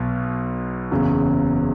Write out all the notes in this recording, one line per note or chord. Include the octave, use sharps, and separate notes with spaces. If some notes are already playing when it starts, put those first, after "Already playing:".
Already playing: B1 B2 B3
F#1 E2 C#3 F#3